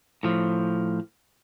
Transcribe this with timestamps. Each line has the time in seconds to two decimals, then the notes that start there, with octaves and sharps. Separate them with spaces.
0.23 A2 F3